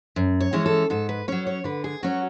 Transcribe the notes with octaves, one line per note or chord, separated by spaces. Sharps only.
F#2
C#5
E3 G#3 C#4
A4
G#2 A4
B4
F#3 C#4 C#5
C#5
D3 B4
G#4
F#3 C#4 F#4